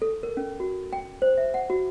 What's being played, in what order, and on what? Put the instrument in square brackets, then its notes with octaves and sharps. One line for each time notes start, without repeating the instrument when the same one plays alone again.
[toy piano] A4
A#4
C#4
F#4
G5
C5
E5
F#5
F#4